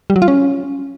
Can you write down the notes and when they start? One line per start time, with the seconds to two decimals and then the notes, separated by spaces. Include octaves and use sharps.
0.10 G3
0.16 F#3
0.22 F4
0.28 C#4